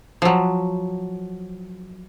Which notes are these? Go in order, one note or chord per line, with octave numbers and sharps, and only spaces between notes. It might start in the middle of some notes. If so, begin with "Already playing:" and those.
F3 F#3